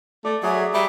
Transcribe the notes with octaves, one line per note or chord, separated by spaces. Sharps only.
A3 D5
F#3 G#4 E5
G3 E5 A#5